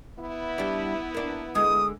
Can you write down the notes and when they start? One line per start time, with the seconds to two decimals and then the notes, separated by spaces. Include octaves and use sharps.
0.19 B3 E4
0.58 G3 D4
1.14 A#3 D4
1.55 D3 G#3 D#6